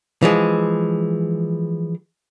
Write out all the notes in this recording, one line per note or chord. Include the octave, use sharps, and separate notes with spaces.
E3 F3 G#3